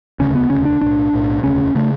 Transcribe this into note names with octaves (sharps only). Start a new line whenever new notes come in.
E1 D2 C#3 C#4
B3
E1 D2 C#3 C#4
D4
B1 A2 D4
B1 A2
E1 D2 C#3 C#4
C#3 A3